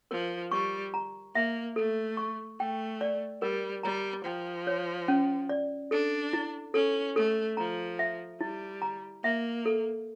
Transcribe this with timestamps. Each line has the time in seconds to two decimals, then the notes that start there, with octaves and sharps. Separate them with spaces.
0.11 F3 A#4
0.52 G3 C#6
0.94 A#5
1.35 A#3 E5
1.76 A3 A4
2.17 C#6
2.60 A3 G5
3.01 D5
3.42 G3 A#4
3.83 G3 A#5
4.25 F3 G5
4.67 C#5
5.08 C#4
5.49 D5
5.91 D4 A4
6.33 E4
6.74 C#4 A4
7.16 A3 A4
7.57 F3 A#5
7.99 E5
8.40 G3 E4
8.82 A#5
9.24 A#3 E5
9.66 A4